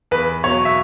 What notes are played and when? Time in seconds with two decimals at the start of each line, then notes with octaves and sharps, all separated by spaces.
0.11 E2 B4
0.44 B2 F#3 C#5
0.65 E5